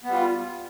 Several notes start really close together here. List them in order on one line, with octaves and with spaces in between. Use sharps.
B3 G3 F4